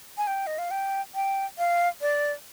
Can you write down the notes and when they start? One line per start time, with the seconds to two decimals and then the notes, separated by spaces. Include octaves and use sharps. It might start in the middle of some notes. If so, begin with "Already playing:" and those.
0.17 G#5
0.27 G5
0.47 D#5
0.58 F5
0.71 G5
1.15 G5
1.58 F5
2.01 D5